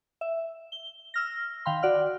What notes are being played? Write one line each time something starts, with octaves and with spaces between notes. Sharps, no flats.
E5
G7
E6 F6 A#6
D#3 F5 G5 B5 C6
F#4 D5 F#5 F6